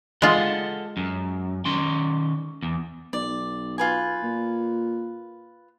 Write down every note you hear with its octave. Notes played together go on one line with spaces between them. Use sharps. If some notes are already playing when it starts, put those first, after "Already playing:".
G#3 F4 A4 F#5
F#2
D#3 C#4 C6
E2
B1 D5
F4 B4 G#5
A#2